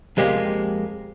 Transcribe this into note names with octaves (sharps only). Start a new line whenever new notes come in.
F2 G#3 A#3 G4 C5